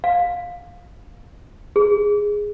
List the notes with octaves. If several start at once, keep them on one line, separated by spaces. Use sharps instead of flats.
F5
G#4